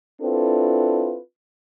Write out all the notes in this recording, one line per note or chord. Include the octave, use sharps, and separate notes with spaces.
C4 D4 E4 F4 A4 B4